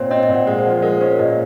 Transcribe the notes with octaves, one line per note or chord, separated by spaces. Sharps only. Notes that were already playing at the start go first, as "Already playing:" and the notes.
Already playing: A#2 C4 C5 C#5
C4 D#5
D#5
A#2
F#5
G#3 F#5
C5
F3
C5
G#3 A#4
C#4 C5
A#2 D#5